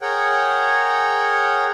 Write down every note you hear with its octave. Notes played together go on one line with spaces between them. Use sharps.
G#4 A#4 C#5 F#5 G5